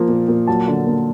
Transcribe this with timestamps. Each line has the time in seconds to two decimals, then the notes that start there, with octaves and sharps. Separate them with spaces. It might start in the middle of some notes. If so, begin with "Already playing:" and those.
Already playing: F3 A#3
0.09 A#2
0.28 A#2
0.47 F#3 A5
0.68 D3
0.87 A#3